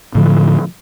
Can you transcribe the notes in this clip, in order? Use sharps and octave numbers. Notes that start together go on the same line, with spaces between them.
A2 D3 F3